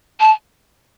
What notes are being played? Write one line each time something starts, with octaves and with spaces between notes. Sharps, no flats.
A5